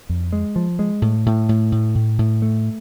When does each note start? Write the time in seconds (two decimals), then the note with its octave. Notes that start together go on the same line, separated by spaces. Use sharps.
0.09 F2
0.33 G#3
0.56 F3
0.79 G#3
1.02 A2
1.26 A2
1.49 A2
1.72 A2
1.95 A2
2.19 A2
2.42 A3